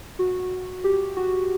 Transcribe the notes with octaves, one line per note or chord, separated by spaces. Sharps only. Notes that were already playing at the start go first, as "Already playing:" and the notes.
F#4
G4
F#4